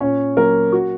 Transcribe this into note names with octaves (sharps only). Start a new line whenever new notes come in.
A#2 C#4 C#5
F#3 A#3 A#4
F#4